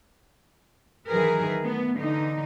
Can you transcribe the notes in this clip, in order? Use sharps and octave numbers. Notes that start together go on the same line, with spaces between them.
D#3 E3 F#3 G#4 A#4 B4
A3 B3
D3 E3 D#4